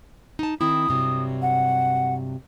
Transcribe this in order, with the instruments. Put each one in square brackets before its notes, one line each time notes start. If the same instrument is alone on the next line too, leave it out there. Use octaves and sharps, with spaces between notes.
[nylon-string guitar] D#4 A5
[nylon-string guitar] D#3 C4 E4 [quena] D#6
[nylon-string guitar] G2 C3 F#3
[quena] F#5